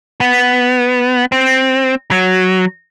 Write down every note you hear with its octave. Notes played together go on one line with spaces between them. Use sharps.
B3
C4
F#3